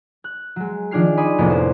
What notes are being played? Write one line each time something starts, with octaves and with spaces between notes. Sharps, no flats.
F#6
F#3 G#3
D#3 F3 D4 G#4 F6 C7
D5 G#5 B5 C6 D#6
C2 F2 A2 A#3 B3
C5